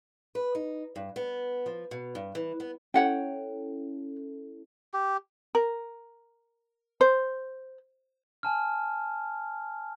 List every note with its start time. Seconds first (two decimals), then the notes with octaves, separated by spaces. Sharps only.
0.35 B4
0.55 D#4
0.96 G2
1.16 B3
1.66 F3
1.91 B2
2.15 G2
2.35 E3
2.60 B3
2.94 C#4 E4 A4 C#5 F#5 G5
4.93 G4
5.55 A#4
7.01 C5
8.43 G#5 A5 F6